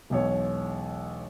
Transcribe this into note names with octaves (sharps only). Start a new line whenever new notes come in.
E1 B1 C#5